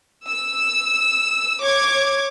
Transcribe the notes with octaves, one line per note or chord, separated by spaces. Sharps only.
E6
C#5 D6 G#6